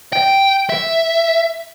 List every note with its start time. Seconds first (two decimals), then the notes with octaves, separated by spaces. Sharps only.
0.13 G5
0.70 E5